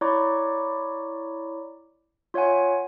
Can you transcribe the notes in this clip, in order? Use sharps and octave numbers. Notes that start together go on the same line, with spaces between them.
E4 C#5 D5 A#5 C#6 D6
F4 C#5 E5 F#5 G#5